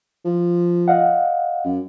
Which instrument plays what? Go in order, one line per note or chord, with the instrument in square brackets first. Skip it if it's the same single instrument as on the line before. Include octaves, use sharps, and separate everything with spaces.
[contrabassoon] F3
[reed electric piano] D#5 F5 F#5
[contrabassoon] F#2